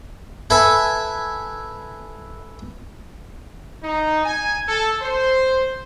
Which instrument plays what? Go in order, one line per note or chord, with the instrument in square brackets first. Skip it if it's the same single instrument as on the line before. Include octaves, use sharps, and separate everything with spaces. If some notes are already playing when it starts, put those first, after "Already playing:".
[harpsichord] A4 B4 E5 G#5
[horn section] D#4
G#5
A4
C5